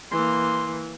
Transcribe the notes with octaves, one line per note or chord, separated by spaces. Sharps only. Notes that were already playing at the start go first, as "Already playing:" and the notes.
E3 A#3 C6